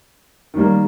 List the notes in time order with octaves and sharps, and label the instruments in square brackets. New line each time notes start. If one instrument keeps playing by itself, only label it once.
[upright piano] D#3 G3 A#3